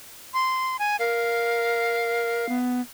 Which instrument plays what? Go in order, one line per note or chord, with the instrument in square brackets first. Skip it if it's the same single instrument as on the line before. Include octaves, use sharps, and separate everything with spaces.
[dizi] C6
G#5
[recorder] A#4 [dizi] F5
[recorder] B3